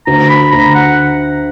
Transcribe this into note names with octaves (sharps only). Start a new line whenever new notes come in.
D2 A#5
B5
D2 A#5
F#5